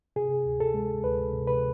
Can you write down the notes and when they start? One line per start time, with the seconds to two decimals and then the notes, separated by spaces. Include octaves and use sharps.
0.16 C3 G#4
0.46 D2
0.60 A4
0.74 G#3
1.04 D2 B4
1.33 C3
1.47 B4